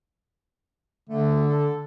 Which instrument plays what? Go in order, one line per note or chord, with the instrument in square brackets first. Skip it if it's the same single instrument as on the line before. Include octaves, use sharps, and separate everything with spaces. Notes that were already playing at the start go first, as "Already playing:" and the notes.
[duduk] D3 [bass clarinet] A3
[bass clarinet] A4